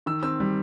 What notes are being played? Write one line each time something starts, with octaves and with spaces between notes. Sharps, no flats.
D#3 E6
C4 E6
G3